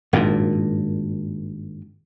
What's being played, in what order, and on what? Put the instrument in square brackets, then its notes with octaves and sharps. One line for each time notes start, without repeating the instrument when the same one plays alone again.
[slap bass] G#1 G2 A#2